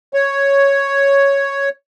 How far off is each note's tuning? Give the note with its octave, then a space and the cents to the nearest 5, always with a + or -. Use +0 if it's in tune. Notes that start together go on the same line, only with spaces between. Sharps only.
C#5 +0